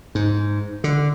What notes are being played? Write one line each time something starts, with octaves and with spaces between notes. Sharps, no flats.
G#2
D3